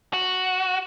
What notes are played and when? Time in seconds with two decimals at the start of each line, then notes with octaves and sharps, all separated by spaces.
0.13 F#4